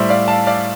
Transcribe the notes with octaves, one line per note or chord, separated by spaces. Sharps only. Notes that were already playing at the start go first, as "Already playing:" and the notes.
Already playing: A2 G3 C5 E5
D5 F5
F5 A5
D5 F5